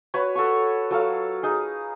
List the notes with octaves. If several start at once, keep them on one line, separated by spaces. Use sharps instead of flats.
F#4 B4 C#5
A4 F#5 C#6
F#3 A4 F5
D#4 G#4